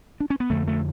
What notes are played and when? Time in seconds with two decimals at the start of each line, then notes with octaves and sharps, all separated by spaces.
0.20 D4
0.30 C#4
0.40 B3
0.50 F2 D3 A3
0.68 A3